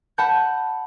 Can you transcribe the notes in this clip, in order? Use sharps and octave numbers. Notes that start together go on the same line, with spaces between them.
F#5 A5 B5 G6